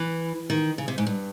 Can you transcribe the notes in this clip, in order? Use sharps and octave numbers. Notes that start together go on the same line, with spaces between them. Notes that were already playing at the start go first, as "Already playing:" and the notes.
Already playing: E3
D#3
C#3
C3
G#2
G2